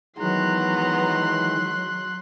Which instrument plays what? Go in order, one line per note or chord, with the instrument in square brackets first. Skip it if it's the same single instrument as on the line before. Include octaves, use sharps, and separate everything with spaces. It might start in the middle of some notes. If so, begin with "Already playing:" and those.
[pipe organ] D#3 E3 G#3 [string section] F#3 [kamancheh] B3 A#5 [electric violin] C6 F#6